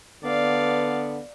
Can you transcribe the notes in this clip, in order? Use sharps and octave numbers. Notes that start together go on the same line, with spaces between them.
D3 B3 D5 F5